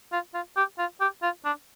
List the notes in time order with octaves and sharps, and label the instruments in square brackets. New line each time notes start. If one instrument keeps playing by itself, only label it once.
[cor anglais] F4
F4
G4
F4
G4
F4
D4